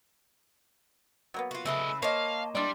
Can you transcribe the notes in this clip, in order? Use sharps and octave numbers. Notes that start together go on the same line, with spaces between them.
F#3 A#3 B3
F4 F#4
C#3 A3 E4 B4 D#5 E6
A#3 C5 C#5 D#5 F5 A5
G3 D4 E4 D5 C6